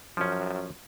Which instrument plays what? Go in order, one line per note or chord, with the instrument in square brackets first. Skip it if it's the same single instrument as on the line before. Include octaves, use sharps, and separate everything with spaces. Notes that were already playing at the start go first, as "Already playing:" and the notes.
[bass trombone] F#2 [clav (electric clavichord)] F3 C#4